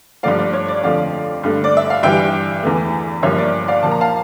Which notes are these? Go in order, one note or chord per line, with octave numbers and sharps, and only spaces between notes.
G2 F3 A3 D5 F5
D5
C#5
D5
F2 D3 F3 A3 D5 F5
G2 D3 A3
D5
E5
F5
G2 E3 G3 E5 G5
E2 E3 A3
G2 F3 A#3 C#5 E5
D5
D5 F5
A#2 F3 A#3 A5
A#5
F5 A5